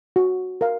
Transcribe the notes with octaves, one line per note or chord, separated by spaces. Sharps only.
F#4
A#4 F5